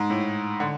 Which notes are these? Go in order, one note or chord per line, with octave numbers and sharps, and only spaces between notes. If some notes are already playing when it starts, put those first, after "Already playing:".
Already playing: G#2
A2
D3